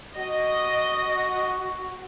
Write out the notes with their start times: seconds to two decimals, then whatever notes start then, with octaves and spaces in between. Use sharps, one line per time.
0.18 F#4 D#5